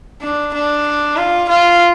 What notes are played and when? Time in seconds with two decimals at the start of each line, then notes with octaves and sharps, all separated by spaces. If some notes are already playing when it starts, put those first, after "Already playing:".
0.22 D4
0.53 D4
1.17 F4
1.49 F4